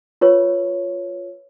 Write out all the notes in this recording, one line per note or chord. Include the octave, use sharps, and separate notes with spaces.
F4 B4 C#5